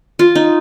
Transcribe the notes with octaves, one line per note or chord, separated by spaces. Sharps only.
F4
D#4